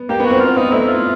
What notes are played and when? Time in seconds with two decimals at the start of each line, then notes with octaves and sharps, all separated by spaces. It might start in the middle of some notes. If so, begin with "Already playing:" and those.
Already playing: B3
0.09 A#3 G4
0.20 B3
0.25 F#4
0.30 C4
0.40 C4 F4
0.57 B3 D#4
0.72 A3 E4
0.88 F4